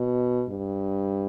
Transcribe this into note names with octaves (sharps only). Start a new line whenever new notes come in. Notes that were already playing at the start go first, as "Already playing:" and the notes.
Already playing: B2
G2